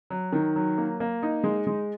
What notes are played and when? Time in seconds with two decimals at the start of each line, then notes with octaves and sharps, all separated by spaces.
0.10 F#3
0.32 D#3
0.56 F#3
0.78 A#3
1.00 A#3
1.23 D#4
1.44 G#3
1.67 G#3